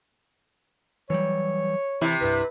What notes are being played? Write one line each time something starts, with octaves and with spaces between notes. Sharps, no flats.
E3 F#3 G3 C#5
C3 E3 E4
C2 G2 B4